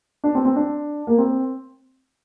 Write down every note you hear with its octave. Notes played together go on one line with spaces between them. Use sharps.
D4
C4
C4
D4
A#3
C4